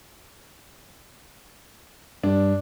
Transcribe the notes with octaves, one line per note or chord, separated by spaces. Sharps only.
G2 G3 D4